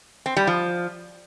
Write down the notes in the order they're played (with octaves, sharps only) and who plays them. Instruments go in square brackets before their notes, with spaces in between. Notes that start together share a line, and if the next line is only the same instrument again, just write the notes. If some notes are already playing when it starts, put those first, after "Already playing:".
[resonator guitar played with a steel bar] C4
G3
F3